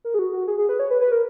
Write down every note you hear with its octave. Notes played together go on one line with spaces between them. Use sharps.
A#4
G#4
F#4
F#4
G#4
G#4
B4
C#5
B4
B4
A#4